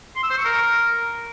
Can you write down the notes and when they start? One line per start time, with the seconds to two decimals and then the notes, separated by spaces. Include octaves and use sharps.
0.15 C6
0.23 E6
0.30 C5
0.37 C#6
0.44 A#4